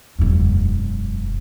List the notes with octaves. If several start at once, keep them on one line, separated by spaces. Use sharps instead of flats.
E1 F#2